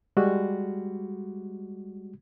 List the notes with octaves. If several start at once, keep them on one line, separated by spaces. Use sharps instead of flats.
G3 G#3 F#4